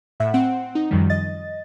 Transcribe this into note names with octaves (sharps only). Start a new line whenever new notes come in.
A2 E5 F#5
C4 F#5
D#4
F#2 D#3 F3 G3
D#5 A6